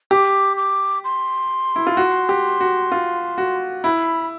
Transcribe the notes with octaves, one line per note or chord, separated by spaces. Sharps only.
G4 D6
D6
C6
E4
F4
F#4
G4
F#4
F4
F#4
E4 B5